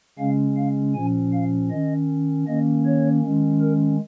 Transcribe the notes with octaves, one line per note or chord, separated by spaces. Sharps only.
C#3 G#3 C#4 F5
F5
A#2 F3 C#4 G#5
F5
D#3 C#4 D#5
D#3 A#3 C#4 D#5
C#5
D#3 G#3 C#4
A#4